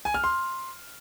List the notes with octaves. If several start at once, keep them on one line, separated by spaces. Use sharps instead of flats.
G#5
F6
C6